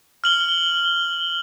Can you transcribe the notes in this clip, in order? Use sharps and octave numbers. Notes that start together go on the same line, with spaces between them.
F6 F#7 G7